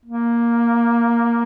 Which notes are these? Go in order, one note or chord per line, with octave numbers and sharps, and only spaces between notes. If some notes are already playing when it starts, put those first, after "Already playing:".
A#3